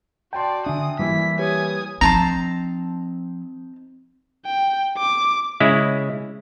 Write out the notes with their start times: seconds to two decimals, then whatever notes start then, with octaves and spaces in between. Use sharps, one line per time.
0.33 F#4 D5 G5 A5 C6
0.66 D3 D4 E5 G#5 D#6
0.99 E3 G3 A#3 E4 B6
1.39 G4 B4 C#5 G#5 D#6
2.01 F3 C4 D4 D#4 A5 A#5 C6
4.46 G5
4.98 D6
5.60 C#3 G#3 E4